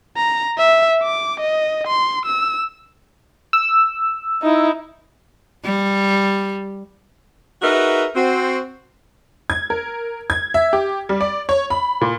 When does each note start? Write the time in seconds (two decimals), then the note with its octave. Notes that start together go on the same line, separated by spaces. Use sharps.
0.17 A#5
0.58 E5
1.03 D6
1.40 D#5
1.88 C6
2.26 E6
3.53 E6
4.42 D#4 E4
5.64 G3
7.62 D#4 F#4 G#4 A#4 B4 E5
8.16 C4 F#4
9.50 G#6
9.70 A#4
10.30 G#6
10.54 E5
10.73 G4
11.09 G3
11.21 D5
11.49 C#5
11.70 B5
12.01 A#2